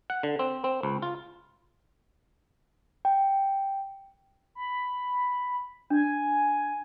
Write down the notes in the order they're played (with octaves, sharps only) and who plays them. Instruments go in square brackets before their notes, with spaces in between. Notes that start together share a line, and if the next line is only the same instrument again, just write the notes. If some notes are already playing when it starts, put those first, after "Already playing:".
[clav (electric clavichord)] F#5
D3
C4
C4
C#2
F4
[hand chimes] G5
[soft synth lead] B5
[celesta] D4 [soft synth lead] G#5